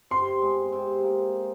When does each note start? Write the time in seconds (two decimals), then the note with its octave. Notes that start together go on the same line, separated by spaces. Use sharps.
0.10 C3 C6
0.42 G#3
0.72 C3
1.04 A#3